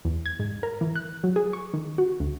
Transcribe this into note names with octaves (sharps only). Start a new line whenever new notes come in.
E2
G#6
G#2
A#4
E3
F#6
F#3
G#4
C#6
D#3
F#4
D2